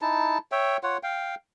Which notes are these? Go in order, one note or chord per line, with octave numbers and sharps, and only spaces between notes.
D#4 E4 A5
C#5 E5 G5
F4 C#5 F#5
F5 G5